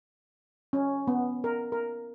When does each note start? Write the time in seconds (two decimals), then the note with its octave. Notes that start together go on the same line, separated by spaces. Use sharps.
0.73 C#4
1.08 B3
1.44 A#4
1.72 A#4